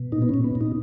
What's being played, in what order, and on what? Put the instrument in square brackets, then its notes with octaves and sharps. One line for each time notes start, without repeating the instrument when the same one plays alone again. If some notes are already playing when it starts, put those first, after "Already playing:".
Already playing: [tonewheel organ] B2
A#2 D#4
B3
A#2 C#4
B3
A#2
D#4